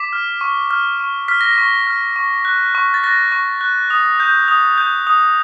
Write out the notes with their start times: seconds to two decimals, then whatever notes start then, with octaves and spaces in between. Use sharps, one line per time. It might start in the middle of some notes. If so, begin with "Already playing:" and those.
Already playing: D6 B6
0.13 F6
0.41 C#6
0.71 F6
1.00 C#6
1.28 F6 B6
1.41 A#6
1.53 B6
1.58 C#6
1.87 F6
2.16 C#6
2.45 F#6
2.75 C#6
2.94 A6
3.04 F#6 A#6
3.32 C#6
3.61 F#6
3.90 D#6
4.20 G6
4.48 D#6
4.78 G6
5.07 D#6